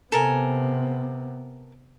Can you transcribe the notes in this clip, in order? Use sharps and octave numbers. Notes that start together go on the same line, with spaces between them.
C3 B3 A4 A#4 G#5